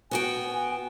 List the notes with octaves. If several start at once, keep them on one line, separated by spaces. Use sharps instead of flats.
B3 F#4 G5 G#5